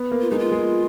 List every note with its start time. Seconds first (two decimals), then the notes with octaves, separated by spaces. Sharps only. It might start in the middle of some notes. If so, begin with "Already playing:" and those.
Already playing: B3
0.12 A#3
0.21 F4
0.31 G#3 D#4
0.39 F4
0.52 G#3